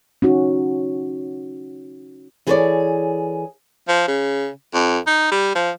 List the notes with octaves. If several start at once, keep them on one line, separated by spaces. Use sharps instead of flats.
C#4 D#4 F#4
E3 G#4 A4 B4 C#5 D5
F3
C#3
F2
D#4
G3
F3